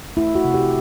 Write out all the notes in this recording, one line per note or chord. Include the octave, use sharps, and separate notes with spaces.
A3 E4
F#4
C3
G4